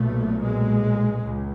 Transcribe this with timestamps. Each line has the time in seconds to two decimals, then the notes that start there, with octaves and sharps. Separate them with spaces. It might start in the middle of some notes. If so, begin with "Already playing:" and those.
Already playing: B1 A#2 A3
0.38 G#3
1.23 C#2